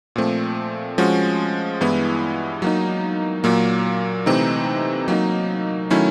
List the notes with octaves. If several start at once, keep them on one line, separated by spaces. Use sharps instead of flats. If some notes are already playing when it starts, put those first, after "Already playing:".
A#2 F3 A3 C4
F3 G#3 C#4 F#4
G2 E3 G#3 B3 E4
F#3 A#3 D#4
A#2 F#3 A#3
C3 E3 A3 C4 D#4
F#3 A#3 D#4
D#3 F#3 A3 C#4 E4